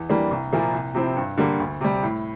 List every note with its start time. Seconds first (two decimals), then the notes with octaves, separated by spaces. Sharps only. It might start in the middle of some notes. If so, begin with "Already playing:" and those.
Already playing: E2
0.09 E3 G3 A#3 D4
0.31 C2
0.52 A#2 F3 A#3 E4
0.73 C2
0.95 C3 F3 C4 E4
1.17 G2
1.38 D3 G3 A#3
1.59 D2
1.81 C3 G3
2.03 A2